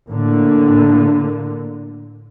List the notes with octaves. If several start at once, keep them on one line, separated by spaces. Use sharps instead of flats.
A2 D3 A#3